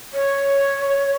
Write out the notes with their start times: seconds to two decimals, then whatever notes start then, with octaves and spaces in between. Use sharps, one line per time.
0.14 C#5